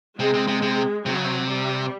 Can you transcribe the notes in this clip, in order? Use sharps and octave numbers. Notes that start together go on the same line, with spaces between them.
C3 G#3
C3
C3
C3
C3 F#3
C#3
C3
G3